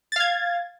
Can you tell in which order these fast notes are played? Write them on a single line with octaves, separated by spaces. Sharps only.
A6 F5 G#6